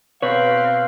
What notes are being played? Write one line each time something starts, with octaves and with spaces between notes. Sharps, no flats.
B2 C4 B4 C#5 F5